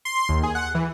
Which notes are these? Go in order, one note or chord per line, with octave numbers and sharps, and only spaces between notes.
C6
D#2
G#4
F#5
E3